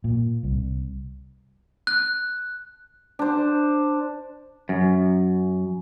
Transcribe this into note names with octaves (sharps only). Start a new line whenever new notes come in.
A#2
C2
F#6
D4 C5
F#2